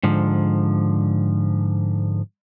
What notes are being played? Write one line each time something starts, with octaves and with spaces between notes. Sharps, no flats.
G#2 D3 F3